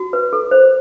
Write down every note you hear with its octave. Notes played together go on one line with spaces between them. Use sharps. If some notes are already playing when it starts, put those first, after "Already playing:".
Already playing: F#4
B4
A4
C5